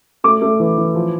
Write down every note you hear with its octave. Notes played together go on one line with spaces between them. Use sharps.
A3 D6
A3
E3
E3
F3